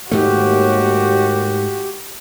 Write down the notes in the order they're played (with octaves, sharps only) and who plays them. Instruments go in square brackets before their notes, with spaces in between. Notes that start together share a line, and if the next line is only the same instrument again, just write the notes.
[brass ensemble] D#2 [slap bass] G#2 A3 [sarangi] F#4 [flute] G4